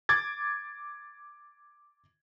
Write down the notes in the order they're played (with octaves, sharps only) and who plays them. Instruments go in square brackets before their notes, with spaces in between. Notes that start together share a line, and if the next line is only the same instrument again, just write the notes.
[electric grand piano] D6 G#6 A6